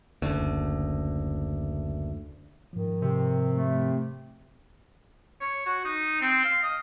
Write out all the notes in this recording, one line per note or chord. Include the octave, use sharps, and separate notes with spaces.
F#1 D2
G#2 D#3 F3
C3
A3
C#5
F#4
D#4
C4
F5
D#5